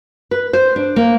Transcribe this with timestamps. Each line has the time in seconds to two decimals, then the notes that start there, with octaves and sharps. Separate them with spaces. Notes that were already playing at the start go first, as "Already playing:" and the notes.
0.31 B4
0.53 C5
0.76 D4
0.96 A#3